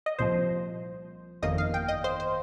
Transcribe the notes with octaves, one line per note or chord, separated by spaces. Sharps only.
D#5
C2 A#2 F3 C5
G1 F2 D#3 A#3 D#5
F5
G5
D#5
C5
C5